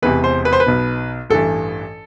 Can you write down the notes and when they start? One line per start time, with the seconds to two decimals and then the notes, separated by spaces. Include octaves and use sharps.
0.02 E1 E2 C3 E3 B4
0.24 C5
0.45 B4
0.53 C5
0.60 B4
0.66 B1 B2
1.30 A1 G2 E3 A4